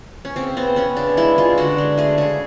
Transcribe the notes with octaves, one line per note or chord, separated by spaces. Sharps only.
C#4
C#3 C4
B3 C4
B3 C#4
C#3 D4
G#3 E4
G#3 F4
D3 F#4
G#3
A3 G#4
C#3 G#4